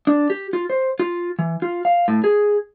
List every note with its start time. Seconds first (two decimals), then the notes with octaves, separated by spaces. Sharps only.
0.07 D4
0.30 G4
0.53 F4
0.70 C5
1.00 F4
1.39 E3
1.62 F4
1.85 F5
2.08 A2
2.24 G#4